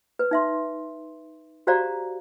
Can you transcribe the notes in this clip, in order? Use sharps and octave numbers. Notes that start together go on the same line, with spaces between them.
B4
D#4 E5 C6
F#4 G4 C5 D5 F5 A#5